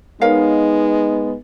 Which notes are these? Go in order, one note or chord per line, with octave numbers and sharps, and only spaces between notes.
G#3 B3 D#4 A#4 C#5 F5